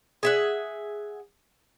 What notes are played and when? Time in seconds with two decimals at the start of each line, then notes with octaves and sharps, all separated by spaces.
0.23 G#4 E5 F#5